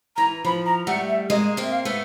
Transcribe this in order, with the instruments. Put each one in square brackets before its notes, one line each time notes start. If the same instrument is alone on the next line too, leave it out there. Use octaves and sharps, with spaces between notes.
[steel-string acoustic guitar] E3 [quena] A#5
[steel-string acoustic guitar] F3 [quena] B5
[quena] A#5
[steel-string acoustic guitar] G3 A3 [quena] F#5
[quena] E5
[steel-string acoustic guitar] G#3 A#3 [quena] D#5
[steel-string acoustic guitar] A#3 C4
[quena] E5
F5
[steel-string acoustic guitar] A3 B3